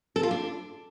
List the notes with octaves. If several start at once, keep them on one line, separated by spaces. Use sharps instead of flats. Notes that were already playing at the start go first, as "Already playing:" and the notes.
A4
F4
D4